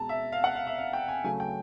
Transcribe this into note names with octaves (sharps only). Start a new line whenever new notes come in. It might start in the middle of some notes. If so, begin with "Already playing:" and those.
Already playing: B2 G#3 A5 A#5
E5
F5
F#5
F5
E5
F5
G5
G#5
C#3 F#3 A3 G#5
G5